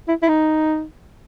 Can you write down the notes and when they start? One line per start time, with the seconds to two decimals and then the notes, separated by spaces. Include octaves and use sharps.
0.08 E4
0.22 E4
0.28 D#4